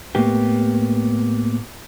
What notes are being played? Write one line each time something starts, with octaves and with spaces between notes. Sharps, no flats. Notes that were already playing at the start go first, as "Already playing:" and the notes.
A2 A#3 B3 G4